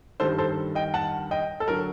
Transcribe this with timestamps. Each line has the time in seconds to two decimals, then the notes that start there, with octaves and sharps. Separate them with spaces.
0.20 G2 D#3 G3 A4 C5
0.38 A4 C5
0.75 D#5 G5
0.94 F#5 A5
1.31 D#5 G5
1.60 A4
1.67 D3 F#3 A#4